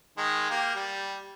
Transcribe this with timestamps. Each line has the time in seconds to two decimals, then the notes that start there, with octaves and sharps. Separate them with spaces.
0.18 D#3 G#3
0.50 A#3 G4
0.75 G3